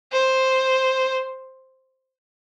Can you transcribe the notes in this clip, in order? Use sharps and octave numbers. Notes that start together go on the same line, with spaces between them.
C5